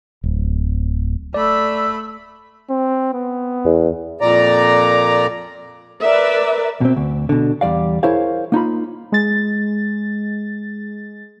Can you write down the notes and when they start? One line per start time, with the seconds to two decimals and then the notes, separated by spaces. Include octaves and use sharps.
0.23 D1
1.34 A3 D5 B5 E6
2.70 C4
3.14 B3
3.65 E2
4.21 F2 A#2 D5 A#5
6.02 A#4 B4 D5 E5
6.81 B2 C4
6.96 D2
7.29 B2 D3
7.61 E2 G3 D5 F5
8.03 E4 G#4 A#4 C5 C#5 F5
8.52 A#3 D#4 F4 B5
9.12 G#3 A6